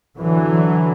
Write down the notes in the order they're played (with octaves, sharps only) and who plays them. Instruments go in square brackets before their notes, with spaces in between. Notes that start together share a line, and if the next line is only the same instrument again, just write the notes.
[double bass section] D3 E3 F#3